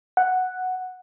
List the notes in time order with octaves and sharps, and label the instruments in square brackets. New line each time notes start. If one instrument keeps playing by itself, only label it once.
[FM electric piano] F#5